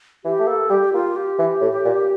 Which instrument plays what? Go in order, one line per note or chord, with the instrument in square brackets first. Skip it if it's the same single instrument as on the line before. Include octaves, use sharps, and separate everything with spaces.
[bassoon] E3 [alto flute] G4
[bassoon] A3
[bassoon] A#3 [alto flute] A4
[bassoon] G3 [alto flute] G4
[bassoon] A#3 [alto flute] F4
[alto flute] G4
[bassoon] E3
A2
A#2